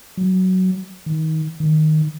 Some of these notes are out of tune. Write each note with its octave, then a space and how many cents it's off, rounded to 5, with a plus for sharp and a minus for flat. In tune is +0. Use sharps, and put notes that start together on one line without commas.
F#3 +10
D#3 +25
D#3 -5